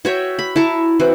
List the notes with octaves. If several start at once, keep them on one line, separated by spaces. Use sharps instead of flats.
F#4 C#5 E5 G5
B5
E4 A5 A#5 C#6
E3 C4 F#4